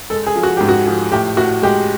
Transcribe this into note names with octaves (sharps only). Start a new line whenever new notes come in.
G#3 A4
G#4
F3
F#4
G#2 G4
F#4
F3
A2 G4
A2 F#4
G#3 G4